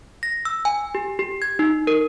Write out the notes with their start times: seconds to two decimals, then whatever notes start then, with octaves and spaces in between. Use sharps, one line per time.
0.23 A#6
0.45 E6
0.65 G#5
0.95 G4
1.19 G4
1.42 G#6
1.59 D#4
1.87 A#4